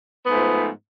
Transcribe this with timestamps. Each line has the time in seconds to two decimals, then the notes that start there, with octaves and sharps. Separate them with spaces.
0.25 B3
0.28 G#2
0.31 A3
0.34 F3